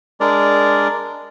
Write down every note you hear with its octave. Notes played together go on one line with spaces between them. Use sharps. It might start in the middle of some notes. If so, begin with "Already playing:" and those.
G#3 D4 A#4 D5